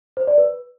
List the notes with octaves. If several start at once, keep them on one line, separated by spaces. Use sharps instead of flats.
C5
D5
B4